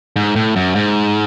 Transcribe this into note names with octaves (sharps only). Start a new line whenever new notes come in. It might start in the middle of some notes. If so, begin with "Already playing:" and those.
G#2
A2
F#2
G#2